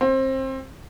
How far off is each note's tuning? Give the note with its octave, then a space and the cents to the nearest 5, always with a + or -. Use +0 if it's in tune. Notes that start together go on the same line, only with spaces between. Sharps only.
C4 +25